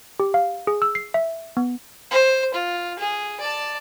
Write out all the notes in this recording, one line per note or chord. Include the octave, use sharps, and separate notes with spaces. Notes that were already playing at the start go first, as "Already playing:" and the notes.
G4
F5
G#4
E6
C7
E5
B3
C5
F4
G#4
D5 A5